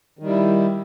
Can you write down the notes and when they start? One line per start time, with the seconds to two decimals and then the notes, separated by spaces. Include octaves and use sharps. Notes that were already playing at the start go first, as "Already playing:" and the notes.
0.19 D#3
0.23 G3
0.27 E4